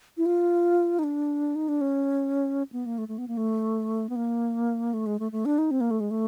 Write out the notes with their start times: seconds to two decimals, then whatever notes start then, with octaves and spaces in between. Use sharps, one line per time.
0.17 E4
0.26 F4
0.99 D#4
1.04 D4
1.55 D#4
1.68 D4
1.81 C#4
2.72 B3
2.86 A#3
2.98 A3
3.08 A3
3.18 B3
3.28 A#3
3.37 A3
4.09 B3
4.16 A#3
4.94 A3
5.06 G#3
5.19 A3
5.32 A3
5.45 D4
5.58 D#4
5.71 C4
5.81 A#3
5.91 A3
6.00 G#3
6.11 A3